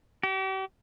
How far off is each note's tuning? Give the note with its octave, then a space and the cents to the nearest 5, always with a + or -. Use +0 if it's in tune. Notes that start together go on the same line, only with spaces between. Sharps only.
G4 -40